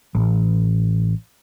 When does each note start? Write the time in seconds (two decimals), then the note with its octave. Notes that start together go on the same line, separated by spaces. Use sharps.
0.15 A1